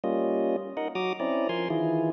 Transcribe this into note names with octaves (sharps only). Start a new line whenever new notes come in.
G3 A#3 C#4 F4 D#5
D#4 A#4 D#5 F#5
F#3 F#4 A#5 D6 D#6
C4 C#4 E4 D5 A#5
F3 A#4 G#5 C6
D#3 E3 E4 F4 G#4